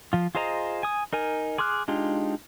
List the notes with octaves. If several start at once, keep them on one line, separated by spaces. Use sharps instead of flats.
F3 F4
F4 G#4 C5 D#5 A#5
G#5 D#6
D#4 A#4 G#5
G#4 C6 D6 F6 F#6
G#3 D4 D#4 F4 G4